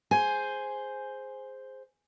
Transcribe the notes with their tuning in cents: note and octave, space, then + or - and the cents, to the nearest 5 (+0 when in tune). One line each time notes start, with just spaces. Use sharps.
G#4 +0 C5 +0 G#5 +5